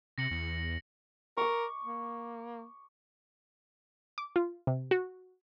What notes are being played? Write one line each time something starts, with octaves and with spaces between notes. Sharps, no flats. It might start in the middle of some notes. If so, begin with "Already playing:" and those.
C3 A#6 C#7 F#7
E2
A#4 C#6 D6
A#3
D6
F4
C3
F#4